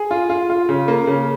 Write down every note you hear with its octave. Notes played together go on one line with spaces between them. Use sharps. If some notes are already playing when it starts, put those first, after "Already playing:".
Already playing: G#4
F4
F4
F4
C#3
A#3
C#3